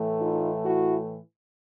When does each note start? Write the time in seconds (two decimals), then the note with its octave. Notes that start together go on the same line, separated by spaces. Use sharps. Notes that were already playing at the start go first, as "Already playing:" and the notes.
Already playing: A2 E3 A3
0.19 D#4 F4
0.64 E4 F#4